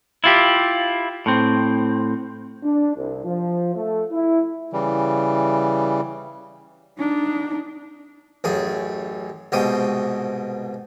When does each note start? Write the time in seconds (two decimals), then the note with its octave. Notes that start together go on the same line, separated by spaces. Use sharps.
0.24 E4 F4 G4
1.26 A2 C4
2.62 D4
2.95 C2
3.24 F3
3.74 A3
4.11 E4
4.73 C#3 E3 G3
6.98 D4 D#4
8.44 A1 F#2 G#4
9.52 C2 G#2 B2 G5 D#6